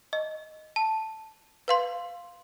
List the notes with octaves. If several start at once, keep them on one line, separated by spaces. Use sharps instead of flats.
D#5
A5
B4 F5 C6